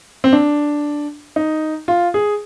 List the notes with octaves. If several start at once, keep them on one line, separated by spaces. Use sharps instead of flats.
C4
D4
D#4
F4
G#4